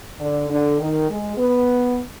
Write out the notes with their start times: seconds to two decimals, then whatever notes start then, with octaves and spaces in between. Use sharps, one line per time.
0.19 D3
0.49 D3
0.79 D#3
1.09 G#3
1.38 B3